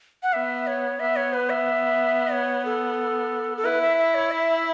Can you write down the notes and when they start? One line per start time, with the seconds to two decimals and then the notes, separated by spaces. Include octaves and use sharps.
0.23 F#5
0.33 B3 E5
0.67 C#5
1.00 B3 E5
1.16 C#5
1.33 B4
1.50 E5
2.33 C#5
2.65 A4
3.57 A4
3.65 E4 B4
3.81 E5
3.98 E5
4.15 C#5
4.31 E5